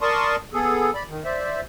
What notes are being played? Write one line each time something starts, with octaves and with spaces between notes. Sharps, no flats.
A#4 D5 A5 C6 C#6 D#6
B3 G#4 A4
D5 B5
D#3
C5 D5 E5